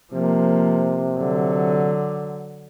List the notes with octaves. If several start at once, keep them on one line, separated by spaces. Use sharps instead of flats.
C3 F3 A#3
D3 F#3